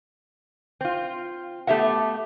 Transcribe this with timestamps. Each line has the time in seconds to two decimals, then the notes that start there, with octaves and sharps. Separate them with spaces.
0.81 C4 F4
1.67 A3 B3 G4 E5 F#5